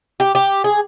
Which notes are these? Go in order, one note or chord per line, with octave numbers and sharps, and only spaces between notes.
G4
G4
G#4